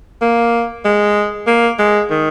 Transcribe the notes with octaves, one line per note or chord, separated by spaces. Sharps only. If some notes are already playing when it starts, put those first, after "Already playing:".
A#3
G#3
A#3
G#3
D#3